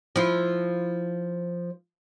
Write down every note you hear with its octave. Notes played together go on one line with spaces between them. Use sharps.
F3 E4